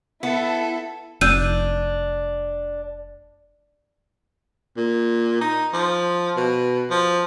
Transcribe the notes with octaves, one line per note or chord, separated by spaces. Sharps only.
B3 E4 A4
F1 D4 E6 G6 D#7
A#2
D#4
F3
B2
F3